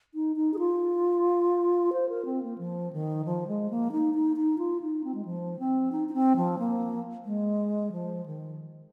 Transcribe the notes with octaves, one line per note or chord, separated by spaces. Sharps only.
D#4
D#4
G#4
F4
C5
A#4
C4
A#3
F3
D#3
F3
G#3
A#3
D#4
D#4
D#4
F4
D#4
C4
G#3
F3
C4
D#4
D#4
C4
F3
A#3
G#3
F3
D#3